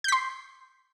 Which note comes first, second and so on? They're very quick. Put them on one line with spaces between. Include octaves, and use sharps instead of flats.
G6 B6 C6